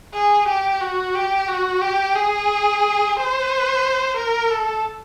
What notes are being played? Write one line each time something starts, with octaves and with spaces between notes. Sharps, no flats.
G#4
G4
F#4
G4
F#4
G4
G#4
C5
A#4
A4